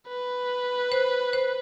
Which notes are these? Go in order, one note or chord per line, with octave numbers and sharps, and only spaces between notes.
B4
C5
C5